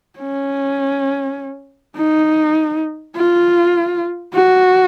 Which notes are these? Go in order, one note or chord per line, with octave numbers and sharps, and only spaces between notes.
C#4
D#4
F4
F#4